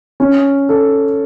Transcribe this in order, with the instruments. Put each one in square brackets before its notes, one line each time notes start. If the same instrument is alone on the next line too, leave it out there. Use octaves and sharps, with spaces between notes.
[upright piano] C#4
A4